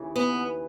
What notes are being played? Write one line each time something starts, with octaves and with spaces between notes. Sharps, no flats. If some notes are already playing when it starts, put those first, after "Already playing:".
Already playing: D#2 C#3 E3
B3